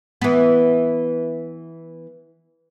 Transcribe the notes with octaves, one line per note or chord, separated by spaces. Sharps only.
E3 B3